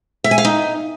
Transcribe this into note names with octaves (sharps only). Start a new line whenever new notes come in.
E5
G#5
F5
D#4